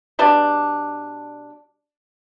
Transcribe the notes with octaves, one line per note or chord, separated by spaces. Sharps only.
B2 G3 D4